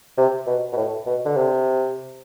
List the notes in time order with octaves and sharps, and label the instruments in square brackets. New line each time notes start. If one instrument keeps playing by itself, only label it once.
[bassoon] C3
B2
B2
A2
B2
D3
C3